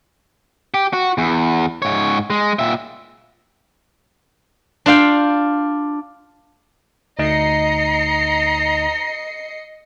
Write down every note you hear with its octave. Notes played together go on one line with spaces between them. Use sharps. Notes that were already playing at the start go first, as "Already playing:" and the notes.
G4
F#4
E2
G#2 C#5
G#3
A#2 E5
D4 F4 F5 G5
D2 D#4 D#5 A#5 C7 C#7